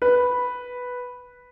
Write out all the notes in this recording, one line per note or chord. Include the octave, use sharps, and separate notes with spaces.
B4